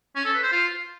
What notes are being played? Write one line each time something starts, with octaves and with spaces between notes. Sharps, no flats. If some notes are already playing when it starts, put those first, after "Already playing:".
C#4
A4
B4
C5
F4